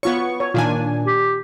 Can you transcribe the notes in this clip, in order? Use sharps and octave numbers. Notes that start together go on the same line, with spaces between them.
B3 F4 C#5 C#6
C#5
A#2 D#3 D4 F4 G#5
G4